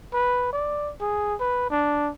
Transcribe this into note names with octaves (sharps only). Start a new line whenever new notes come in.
B4
D5
G#4
B4
D4